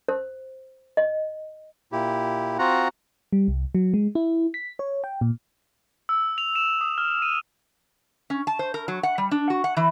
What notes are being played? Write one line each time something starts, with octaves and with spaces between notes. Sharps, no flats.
C5
D#5
A#2 E4 G4
C4 F4 F#4 F#5 A#5
G3
C2
F#3
G#3
E4
B6
C#5
G5
A#2
E6
F7
E7
D#6
F6
D#7
C#4
A5
C5
A#4
F#3
F#5
G3
D4
F#4
F#5
E3